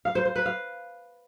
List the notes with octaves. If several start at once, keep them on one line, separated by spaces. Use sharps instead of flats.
F5
C5
C5
B4
F5